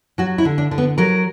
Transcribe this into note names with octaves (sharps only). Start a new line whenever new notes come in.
F#3 F#4
E4
D3
D4
D3
B3
F#3 A#4